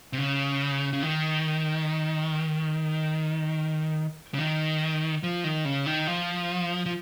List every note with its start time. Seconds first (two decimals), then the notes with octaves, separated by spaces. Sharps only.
0.13 C3
0.18 C#3
0.93 C#3
1.03 D#3
4.34 C#3
4.39 D#3
5.23 F3
5.44 D#3
5.65 C#3
5.86 D#3
6.07 F3
6.86 F3